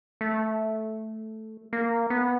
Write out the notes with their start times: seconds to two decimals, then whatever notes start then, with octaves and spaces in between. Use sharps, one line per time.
0.21 A3
1.73 A#3
2.10 B3